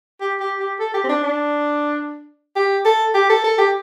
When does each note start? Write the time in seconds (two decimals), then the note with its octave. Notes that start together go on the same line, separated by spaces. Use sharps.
0.21 G4
0.40 G4
0.60 G4
0.79 A4
0.94 G4
1.04 C4
1.09 D4
1.23 D4
2.56 G4
2.85 A4
3.14 G4
3.29 A4
3.44 A4
3.58 G4